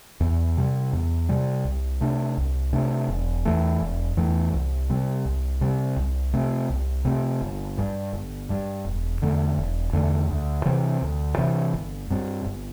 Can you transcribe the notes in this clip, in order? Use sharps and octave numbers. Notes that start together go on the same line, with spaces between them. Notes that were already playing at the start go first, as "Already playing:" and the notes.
E2
C3 G3
E2
C3 G3
C2
C3 A3 D4
C2
C3 A3 D4
E1
E2 E3 A3
E1
E2 E3 A3
C2
C3 G3 C4
C2
C3 G3 C4
C2
C3 A3 C4
C2
C3 A3 C4
G1
G2 G3
G1
G2 G3
E1
E2 D3 A3
E1
E2 D3 A3
D2
C3 E3 C4
D2
C3 E3 C4
G1
G2 G3 C4
G1